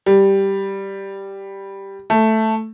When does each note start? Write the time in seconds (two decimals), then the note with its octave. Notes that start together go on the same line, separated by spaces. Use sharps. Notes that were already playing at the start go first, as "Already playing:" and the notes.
0.06 G3
2.10 A3